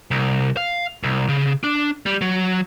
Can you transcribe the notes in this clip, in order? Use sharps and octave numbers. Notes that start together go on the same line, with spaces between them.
C2
F5
C2
C#3
D4
G3
F#3